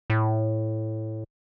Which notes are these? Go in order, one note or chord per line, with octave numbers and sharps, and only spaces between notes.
A2